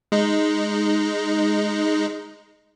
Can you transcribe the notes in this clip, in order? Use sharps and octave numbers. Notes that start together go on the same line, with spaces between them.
G#3 D#4